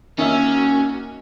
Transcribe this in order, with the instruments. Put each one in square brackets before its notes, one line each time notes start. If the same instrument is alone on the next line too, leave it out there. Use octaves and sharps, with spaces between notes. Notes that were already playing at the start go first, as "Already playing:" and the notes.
[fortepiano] D#3 E5 [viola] A#3 F#4 [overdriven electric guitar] C#4